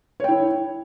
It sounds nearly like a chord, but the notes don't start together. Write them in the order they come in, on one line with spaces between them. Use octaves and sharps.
C#5 G5 E4